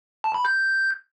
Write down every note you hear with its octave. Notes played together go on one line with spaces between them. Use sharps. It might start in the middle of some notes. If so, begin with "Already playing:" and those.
A5
B5
G6